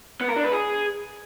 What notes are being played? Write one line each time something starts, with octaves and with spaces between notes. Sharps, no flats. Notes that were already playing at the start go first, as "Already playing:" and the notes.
B3
A#4
D4
B4
G#4